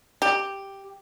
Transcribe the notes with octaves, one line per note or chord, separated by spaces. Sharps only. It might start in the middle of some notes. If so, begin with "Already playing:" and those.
G4